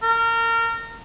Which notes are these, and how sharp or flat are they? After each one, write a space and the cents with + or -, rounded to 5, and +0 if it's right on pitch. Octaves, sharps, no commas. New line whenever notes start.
A#4 -25